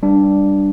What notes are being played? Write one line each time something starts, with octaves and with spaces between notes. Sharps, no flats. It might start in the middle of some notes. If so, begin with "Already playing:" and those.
G3 D4